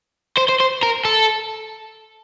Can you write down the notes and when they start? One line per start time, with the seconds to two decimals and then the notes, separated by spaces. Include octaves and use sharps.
0.37 C5
0.49 C5
0.60 C5
0.83 A#4
1.05 A4